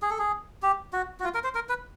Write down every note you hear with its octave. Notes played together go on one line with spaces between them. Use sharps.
G#4
A4
G#4
G4
F#4
F#4
F4
A#4
C5
A#4
B4